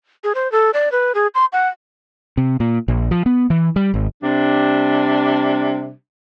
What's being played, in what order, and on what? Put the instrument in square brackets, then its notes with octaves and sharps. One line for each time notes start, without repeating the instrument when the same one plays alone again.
[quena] G#4
C5
A4
D5
B4
G#4
C6
F#5
[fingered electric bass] C3
A#2
A#1
F3
B3
E3
G3
G#1
[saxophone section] C3 G3 D4